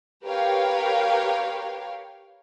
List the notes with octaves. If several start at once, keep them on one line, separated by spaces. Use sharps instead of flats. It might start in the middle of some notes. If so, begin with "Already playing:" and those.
G4 A#4 B4 C#5 F5 G5